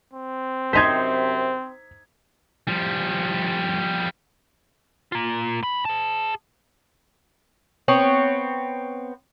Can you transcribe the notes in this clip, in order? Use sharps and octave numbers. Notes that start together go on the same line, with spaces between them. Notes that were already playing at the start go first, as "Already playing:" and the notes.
C4
F#2 C3 D#4 C5 G#6 B6
F3 G3
A#3 F4
F#2 B5
G#4 A5
B3 C4 C#5